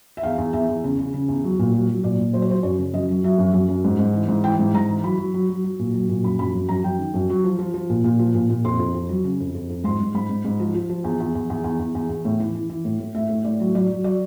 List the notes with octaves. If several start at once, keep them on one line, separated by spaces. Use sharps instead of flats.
E5
E2 F5
E2
E2 E5
E2
C#3
C#3
C#3
E2
F#3
A#2
F#3
F#3
A#2 D5
A#2
F#3 C5
C#5
F#3 C5
F#2 C#5
C#3
F#2 D#5
F#3
F#3 E5
F#2
F#2
F#2
G#2
G#2
E3
G#2
E3 G5
G#2
G#2 A#5
E3
F#3 B5
F#3
F#3
F#3
F#3
A#2
F#3
A#2
F#2 B5
F#2 B5
F#2
F#2 A#5
F#2 G5
D#3
F#2
F#3
F3
F3
F3
A#2
A#2
F3
A#2
A#2
F2 C6
F2
F2
F#3
C#3
F2
F2
F2
G#2 C6
G#2
G#2 B5
G#2
G#2
F3
F3
F3
E2
E2
E2
E2
E2
E2
E2
E2
A2
E3
E3
E3
A2
A2
A2 E5
A2
A2 D5
F#3
F#3 D5
F#3
F#3 D5